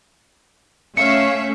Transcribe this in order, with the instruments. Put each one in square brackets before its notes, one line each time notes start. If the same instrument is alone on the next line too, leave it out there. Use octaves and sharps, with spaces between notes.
[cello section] A3 C#4 [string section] C#5 E5 [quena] F5 [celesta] C#7